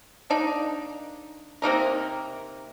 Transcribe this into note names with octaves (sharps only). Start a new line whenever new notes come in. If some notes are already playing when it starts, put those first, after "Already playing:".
A#3 D4 D#4
C3 A#3 D#4 A#4